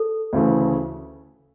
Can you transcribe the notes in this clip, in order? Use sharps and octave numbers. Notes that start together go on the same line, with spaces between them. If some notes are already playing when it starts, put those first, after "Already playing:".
Already playing: A4
D2 C#3 E3 A3